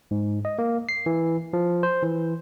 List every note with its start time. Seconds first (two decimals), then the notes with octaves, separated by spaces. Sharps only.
0.11 G#2
0.45 D#5
0.59 A#3
0.89 C7
1.06 E3
1.53 F3
1.83 C5
2.02 E3